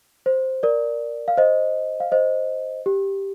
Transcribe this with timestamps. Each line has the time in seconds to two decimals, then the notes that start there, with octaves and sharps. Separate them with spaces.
0.26 C5
0.63 A#4 D5
1.28 F5
1.37 C5 D#5
2.00 F5
2.12 C5 D#5
2.86 G4